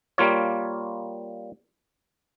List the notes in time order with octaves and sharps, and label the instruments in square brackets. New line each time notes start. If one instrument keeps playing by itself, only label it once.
[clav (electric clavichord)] G3 A#3 F4 C#5